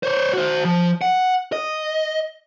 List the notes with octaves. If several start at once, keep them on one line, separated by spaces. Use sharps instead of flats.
C5 C#5
F#4 C5
F3
F#5
D#5